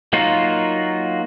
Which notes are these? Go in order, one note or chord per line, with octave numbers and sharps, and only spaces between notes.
F#3 A#3 D#4 F4 F#4